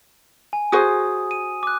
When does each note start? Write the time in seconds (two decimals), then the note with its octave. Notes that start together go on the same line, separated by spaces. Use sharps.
0.53 G#5
0.72 F#4 G#4 C5 D#6
1.31 D#7
1.63 D6 F#6